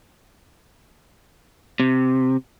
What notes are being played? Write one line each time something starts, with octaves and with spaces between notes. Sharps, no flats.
C3